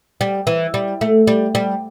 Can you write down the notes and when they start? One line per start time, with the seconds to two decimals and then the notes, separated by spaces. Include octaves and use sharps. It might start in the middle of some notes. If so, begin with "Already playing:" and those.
0.21 G3
0.47 E3
0.74 G3
1.01 A3
1.27 G3
1.55 G3